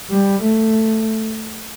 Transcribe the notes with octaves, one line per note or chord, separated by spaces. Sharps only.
G3
A3